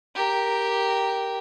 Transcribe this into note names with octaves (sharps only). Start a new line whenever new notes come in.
G4 A#4